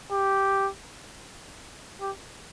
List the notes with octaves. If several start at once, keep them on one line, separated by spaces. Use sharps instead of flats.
G4
G4